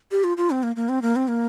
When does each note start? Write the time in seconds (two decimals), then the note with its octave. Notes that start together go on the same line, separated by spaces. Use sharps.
0.11 G4
0.24 F4
0.37 F4
0.51 C4
0.63 A#3
0.76 A#3
0.89 C4
1.02 A#3
1.16 C4
1.28 A#3